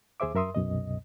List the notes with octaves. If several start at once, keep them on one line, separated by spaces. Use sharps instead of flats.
D#2 G#4 C5 E5 D6
F#2 A#4 E5 C6 D#6
C2 F#2 B2 D#5